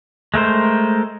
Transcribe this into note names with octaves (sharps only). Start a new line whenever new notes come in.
G#3 A3 A#4 C5